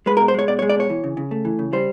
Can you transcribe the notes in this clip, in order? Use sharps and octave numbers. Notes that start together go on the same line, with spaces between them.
G#3 B4
A#4
B2
C5
G#3 C#5
B2 D5
C#5
G#3
D5
B2 C#5
E3
C#3
C#3
A3
E3
C#3
G3 C5